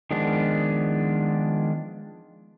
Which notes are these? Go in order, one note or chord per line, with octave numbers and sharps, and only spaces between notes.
D#3 F3 G#3 B3 D4